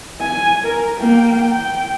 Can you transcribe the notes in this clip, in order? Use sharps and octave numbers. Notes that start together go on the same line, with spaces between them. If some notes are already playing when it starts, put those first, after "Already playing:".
G#5
A#4
A#3 G5
G5